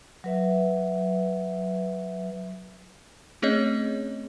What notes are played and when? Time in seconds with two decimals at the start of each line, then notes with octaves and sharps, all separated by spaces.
0.24 F#3 B4 E5
3.42 A3 C4 C#4 G#4 C#5 D#5